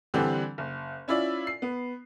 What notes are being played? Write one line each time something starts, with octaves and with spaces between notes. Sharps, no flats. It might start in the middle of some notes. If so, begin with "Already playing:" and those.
D3 E3 G3 C4 D4
F#1
C#4 E4 F4 D5
C7
B3